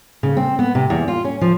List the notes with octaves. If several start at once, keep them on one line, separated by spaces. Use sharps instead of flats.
C#3
C4
B3
C3
E2
F4
C#4
F3